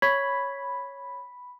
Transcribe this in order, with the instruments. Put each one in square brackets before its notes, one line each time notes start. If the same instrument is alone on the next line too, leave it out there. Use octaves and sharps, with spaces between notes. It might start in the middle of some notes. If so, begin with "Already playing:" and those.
[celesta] C#5 C#6 G#6 [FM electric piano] B5